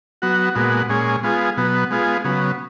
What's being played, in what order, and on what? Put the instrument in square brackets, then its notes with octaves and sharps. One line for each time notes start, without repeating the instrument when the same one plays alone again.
[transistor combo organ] F#3 B3 F#4
A#2 G#3 B3 F#4
A#2 G#3 C#4 G#4
G#3 B3 F4 G#4
B2 F#3 B3
G#3 B3 F4 G#4
C#3 F#3 B3